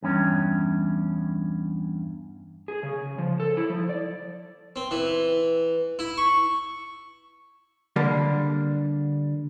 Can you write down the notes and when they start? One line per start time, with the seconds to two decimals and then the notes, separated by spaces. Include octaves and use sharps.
0.03 E2 G2 C#4
2.68 G#4
2.83 C#3
3.18 F3
3.40 A4
3.57 E4
3.70 F3
3.89 D5
4.76 C4
4.91 E3
5.99 E4
6.18 C#6
7.96 D3 G3 A#3 D4